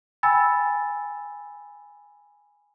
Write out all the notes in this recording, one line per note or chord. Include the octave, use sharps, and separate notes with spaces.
G5 G#5 B5 E6 A6